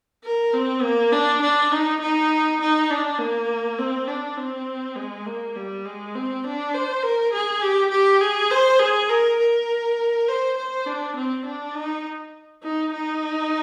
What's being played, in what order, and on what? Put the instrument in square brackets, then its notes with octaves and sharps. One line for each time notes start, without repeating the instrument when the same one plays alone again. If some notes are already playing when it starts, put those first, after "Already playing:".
[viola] A#4
C4
A#3
D4
D4
D#4
D#4
D#4
D4
A#3
C4
D4
C4
G#3
A#3
G3
G#3
C4
D4
C5
A#4
G#4
G4
G4
G#4
C5
G#4
A#4
A#4
C5
C5
D4
C4
D4
D#4
D#4
D#4